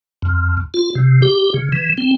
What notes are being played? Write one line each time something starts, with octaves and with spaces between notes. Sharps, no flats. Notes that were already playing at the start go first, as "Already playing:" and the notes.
F2
F4
C3
G4
C#3
E3
C4